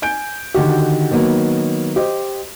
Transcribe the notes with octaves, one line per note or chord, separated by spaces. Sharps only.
G#5 G6 D7
D3 D#3 F#4 G4
D#3 F#3 A#3 B3
G4 C5 D#5